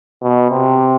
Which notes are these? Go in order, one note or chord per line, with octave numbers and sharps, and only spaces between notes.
B2
C3